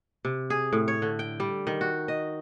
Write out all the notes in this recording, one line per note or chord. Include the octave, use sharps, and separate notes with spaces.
C3
G#4
A2
C#5
D3
G5
G3
D#3
F#4
D#5